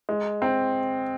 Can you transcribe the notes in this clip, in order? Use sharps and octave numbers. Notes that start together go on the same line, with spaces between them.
G#3
C4